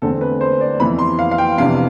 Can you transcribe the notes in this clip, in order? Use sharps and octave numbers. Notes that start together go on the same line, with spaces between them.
E2 D3 A3 C4 A4
B4
C5
D5
F2 E3 B3 B5
C6
F5
F5
G5
F2 C3 E3 B3 D4 F5